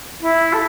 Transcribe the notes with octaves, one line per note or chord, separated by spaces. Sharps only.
E4
A4